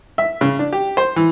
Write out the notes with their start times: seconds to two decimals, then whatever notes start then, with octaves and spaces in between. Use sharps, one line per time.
0.18 E5
0.41 C#3
0.59 D4
0.73 G4
0.97 C5
1.16 E3